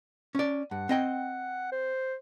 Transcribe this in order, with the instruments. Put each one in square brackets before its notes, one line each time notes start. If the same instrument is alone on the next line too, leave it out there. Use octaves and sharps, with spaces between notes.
[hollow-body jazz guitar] C#4 D5
[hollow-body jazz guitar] G2 [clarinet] F#5
[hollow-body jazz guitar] C4 D#5 G5
[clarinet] C5